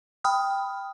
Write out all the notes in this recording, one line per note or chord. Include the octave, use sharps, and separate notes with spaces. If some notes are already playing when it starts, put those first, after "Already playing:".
G5 B5 D#6 F6